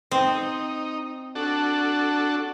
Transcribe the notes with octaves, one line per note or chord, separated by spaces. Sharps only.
C4 D#4
D4 F#4 A4